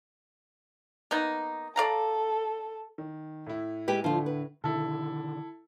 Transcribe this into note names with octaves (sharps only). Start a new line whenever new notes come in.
A#3 B3 D#4
A4 D5 F5 A#5
D#3
A2 E4
G#3 G4 B4
D3 F3 F4
B4
B2 D3 D#3 E4 A4